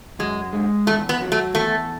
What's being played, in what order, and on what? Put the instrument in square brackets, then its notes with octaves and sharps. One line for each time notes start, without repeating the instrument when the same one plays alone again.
[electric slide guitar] F#2 [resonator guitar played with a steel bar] G#3
[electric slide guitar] G#3
[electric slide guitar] E2 [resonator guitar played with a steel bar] A3
[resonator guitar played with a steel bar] B3
[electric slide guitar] F#3
[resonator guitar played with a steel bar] A3
[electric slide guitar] E2 [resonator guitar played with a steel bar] A3